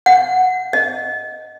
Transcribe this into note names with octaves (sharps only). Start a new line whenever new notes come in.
F#5
D#5